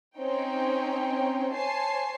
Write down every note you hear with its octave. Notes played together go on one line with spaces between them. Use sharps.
C4 C#4 D#4 C#5 G5
C5 C#5 G#5 A5 C7